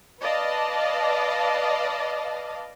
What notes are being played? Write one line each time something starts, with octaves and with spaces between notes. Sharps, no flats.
B4 D5 D#5 F5 A5